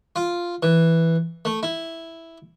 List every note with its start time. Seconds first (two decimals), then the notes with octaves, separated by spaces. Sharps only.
0.16 F4
0.63 E3
1.45 A3
1.63 E4